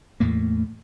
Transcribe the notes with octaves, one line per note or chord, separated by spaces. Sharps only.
E2 A2 A3 A#3